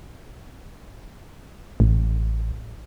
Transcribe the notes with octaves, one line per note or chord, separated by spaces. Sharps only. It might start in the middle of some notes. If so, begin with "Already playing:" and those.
A1